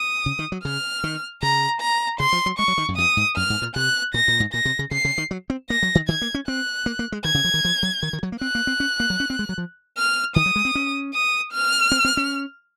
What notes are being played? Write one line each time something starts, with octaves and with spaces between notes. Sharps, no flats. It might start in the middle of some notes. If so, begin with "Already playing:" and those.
Already playing: D#6
C#3
D#3
F#3
C#3 F6
D#3
C#3 A#5
A#5
C#3 C6
F3
F#3
G#3 C#6
F#3
D#3
F#2
F2 D#6
G#2
F#2 F6
G#2
A#2
C3 F#6
A#2 A#6
A#2
G#2
A#2 A#6
C3
C#3
C#3 C7
C#3
D#3
F#3
C4
A#3 A#6
F#3
D#3
D#3 G#6
A#3
C#4
C4 F#6
A#3
A#3
G#3
D#3 G#6
C#3
F3
D#3
F3
F#3
D#3
D#3
F#3
A#3
C4 F#6
A#3
C4
C#4
A#3
F#3
C#4
C4
G#3
F#3
F3
F6
D#3 D#6
F#3
G#3
C4
C#4
D#6
F6
C4
C4
C#4